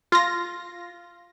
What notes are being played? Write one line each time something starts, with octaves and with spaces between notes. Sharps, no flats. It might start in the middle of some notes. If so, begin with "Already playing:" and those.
F4 A#6